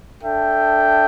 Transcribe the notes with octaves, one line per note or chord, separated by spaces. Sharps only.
D4 A4 E5 G5